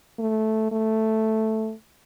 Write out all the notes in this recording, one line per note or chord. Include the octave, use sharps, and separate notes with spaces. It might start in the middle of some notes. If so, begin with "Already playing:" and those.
A3
A3